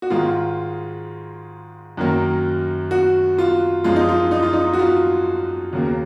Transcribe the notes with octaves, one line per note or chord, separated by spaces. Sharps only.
F#4
G#2 D#3 G#3 F4
F#2 D#3 F#3 A#3
F#4
F4
F#2 F3 G#3 F4
D#4
F4
D#4
F4
D#4
F#4
F4
D#2 C#3 F#3 A#3